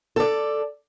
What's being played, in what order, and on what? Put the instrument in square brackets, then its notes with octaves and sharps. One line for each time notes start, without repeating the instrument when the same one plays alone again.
[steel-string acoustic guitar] A4 D5